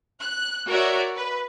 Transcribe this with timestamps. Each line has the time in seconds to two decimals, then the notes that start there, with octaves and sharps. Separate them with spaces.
0.19 F#6
0.68 F#4 A#4 C#5 D5 E5
1.16 B4